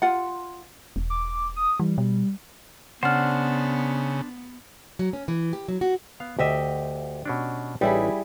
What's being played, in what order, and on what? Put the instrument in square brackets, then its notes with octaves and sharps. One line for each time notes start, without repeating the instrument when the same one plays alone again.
[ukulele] F4 F#5
[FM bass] E1
[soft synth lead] D6
D#6
[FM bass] E3 [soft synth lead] G3
[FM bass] B2 [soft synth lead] G3
[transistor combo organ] C#3 [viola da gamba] B3 [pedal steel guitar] D4 C5 [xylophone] F#5 F6
[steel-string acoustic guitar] F#3
C#4
E3
G4
F#3
F#4
[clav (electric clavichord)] B3 F5
[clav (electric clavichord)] D2 [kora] G4 D#5 E5
[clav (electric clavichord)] B2 C#4 D4
[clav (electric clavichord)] A1 D#4 [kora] G3 E4 G#4